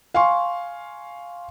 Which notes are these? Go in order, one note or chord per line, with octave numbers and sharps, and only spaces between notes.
F5 G#5 C6 C#6